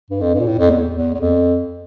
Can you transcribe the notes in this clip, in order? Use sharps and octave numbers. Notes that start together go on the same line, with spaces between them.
G2
F2
G2
A#2
A2
F2
E2
E2
E2
F2